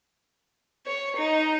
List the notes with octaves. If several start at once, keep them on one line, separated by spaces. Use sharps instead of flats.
C#5
D#4